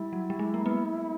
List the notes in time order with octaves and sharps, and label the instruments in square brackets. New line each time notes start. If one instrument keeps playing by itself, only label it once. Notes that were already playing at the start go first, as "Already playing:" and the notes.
Already playing: [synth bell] G3 [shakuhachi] E4
[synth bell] F#3
G3
G#3
A#3
B3